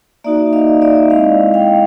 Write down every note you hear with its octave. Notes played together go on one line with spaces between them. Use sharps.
A#3 D#4 F#4 D5 E5
D#5 F5
D5 E5
G#3 C4 E4 D#5 F5
F5 G5